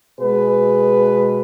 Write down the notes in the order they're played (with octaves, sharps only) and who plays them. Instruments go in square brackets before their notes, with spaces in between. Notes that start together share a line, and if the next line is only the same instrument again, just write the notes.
[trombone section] B2 G#3 G#4 B4